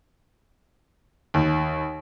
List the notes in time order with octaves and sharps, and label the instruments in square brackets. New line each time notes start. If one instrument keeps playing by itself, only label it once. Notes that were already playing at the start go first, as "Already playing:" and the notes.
[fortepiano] D#2